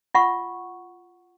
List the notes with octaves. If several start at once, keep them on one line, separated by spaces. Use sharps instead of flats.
F4 F#5 C#6